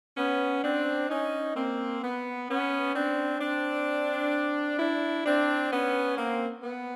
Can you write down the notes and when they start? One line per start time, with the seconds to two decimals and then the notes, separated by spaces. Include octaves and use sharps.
0.17 B3 C#4
0.64 C4 D4
1.09 C#4 D#4
1.55 A#3 C4
2.02 B3
2.49 B3 C#4
2.95 C4 D4
3.40 C4 D4
4.78 D4 E4
5.25 C4 D4
5.71 B3 C#4
6.17 A#3 C4
6.63 B3